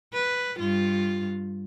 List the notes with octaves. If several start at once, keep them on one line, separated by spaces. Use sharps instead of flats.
B4
G2 F4